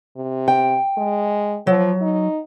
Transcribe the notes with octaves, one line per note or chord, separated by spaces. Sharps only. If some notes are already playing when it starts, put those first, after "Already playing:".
C3
G5
G#3
F3 F#3
D#4